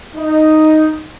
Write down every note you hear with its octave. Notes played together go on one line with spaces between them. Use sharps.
D#4